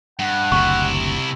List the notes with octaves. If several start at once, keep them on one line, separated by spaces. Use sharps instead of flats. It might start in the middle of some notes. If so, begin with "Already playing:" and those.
G2 F#5
F#1 D2 C3 E4 C#6